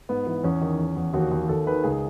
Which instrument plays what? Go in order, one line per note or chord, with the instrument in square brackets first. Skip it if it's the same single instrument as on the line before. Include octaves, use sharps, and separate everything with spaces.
[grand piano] G#2 B3
E3
E2 C#4
D#3
E2
E2
D#2 F#4
D#2
D#2 A4
D#3 B4
C#2 G#4